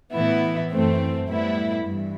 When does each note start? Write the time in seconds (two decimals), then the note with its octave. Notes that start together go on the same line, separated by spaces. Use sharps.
0.14 A2 E3 B3 E4
0.71 F#2 E3 A3 C4
1.29 A2 G3 B3 E4
1.86 G2 E3